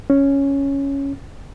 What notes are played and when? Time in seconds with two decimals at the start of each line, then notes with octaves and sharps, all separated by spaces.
0.10 C#4